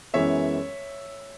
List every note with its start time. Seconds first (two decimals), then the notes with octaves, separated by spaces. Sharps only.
0.14 F#2 E3 G#3 B3 C#5 E5